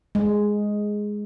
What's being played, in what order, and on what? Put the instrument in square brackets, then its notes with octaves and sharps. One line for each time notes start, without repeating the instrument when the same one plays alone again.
[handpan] G#3